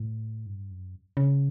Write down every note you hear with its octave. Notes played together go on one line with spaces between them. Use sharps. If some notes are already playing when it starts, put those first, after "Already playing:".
Already playing: A2
G2
F#2
C#3